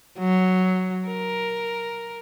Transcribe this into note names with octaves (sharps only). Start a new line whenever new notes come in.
F#3
A#4